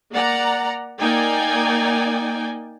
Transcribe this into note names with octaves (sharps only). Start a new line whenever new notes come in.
A#3 D5 F#5 A#5
A#3 D#4 D5 G5 G#5